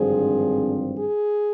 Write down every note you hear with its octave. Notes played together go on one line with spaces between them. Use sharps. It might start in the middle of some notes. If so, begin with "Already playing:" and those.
Already playing: G#1 G2 D3 F3 C4 G#4
G#4